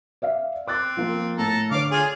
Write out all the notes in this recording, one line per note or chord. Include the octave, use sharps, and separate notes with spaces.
D5 E5 F5
C4 D6 F#6 A6
F3 A#3 F4
A2 A4 A#5
D3 C#5 F5 D6
F4 G#4